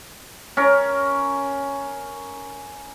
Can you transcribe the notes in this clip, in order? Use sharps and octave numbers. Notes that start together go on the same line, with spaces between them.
C#4 A#4